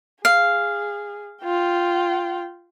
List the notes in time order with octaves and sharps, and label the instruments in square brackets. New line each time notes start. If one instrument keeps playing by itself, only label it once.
[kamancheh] G#4 [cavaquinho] F5
[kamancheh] F4 G5